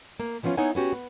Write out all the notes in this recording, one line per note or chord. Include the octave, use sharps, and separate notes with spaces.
A#3
E3 F3 B3 C#4 F4
B3 D#4 E4 C#5 F#5 G#5
B3 C#4 F#4 G4
B3